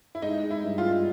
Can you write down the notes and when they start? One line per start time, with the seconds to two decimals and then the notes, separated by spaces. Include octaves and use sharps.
0.15 E4
0.22 G#3 D#4
0.43 G#3
0.50 E4
0.64 G2
0.78 F4
0.85 G2